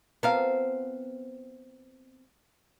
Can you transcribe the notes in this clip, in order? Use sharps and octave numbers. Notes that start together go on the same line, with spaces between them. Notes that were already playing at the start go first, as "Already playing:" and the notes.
F3 B3 C4 A#4 F5